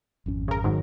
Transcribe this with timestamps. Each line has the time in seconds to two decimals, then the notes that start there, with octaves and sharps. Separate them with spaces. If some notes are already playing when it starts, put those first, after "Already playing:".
0.26 G#1 F2 C#4
0.48 C#3 A#4
0.64 G#2 D#3 F#3